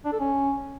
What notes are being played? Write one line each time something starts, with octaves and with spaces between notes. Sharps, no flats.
D4
A4
C#4